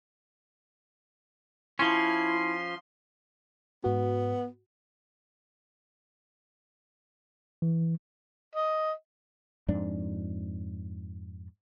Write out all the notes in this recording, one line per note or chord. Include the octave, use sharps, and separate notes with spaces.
F3 C#4 E4 C6
G#2 B3 F#4
E3
D#5
F2 G#2 D4